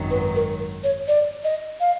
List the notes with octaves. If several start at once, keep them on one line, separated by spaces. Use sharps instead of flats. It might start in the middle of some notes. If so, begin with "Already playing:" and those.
Already playing: G#1 F#2 D#3 F#3
B4
A#4
C#5
D5
D#5
F5